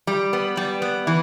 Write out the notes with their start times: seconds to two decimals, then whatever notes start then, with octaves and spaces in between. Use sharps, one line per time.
0.07 G3
0.33 B3
0.57 G3
0.82 B3
1.07 E3